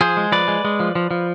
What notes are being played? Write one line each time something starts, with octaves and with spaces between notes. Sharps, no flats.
F3 G#4 C5
G#3
F3 B4 D5
G#3
G#3
F3
F3
F3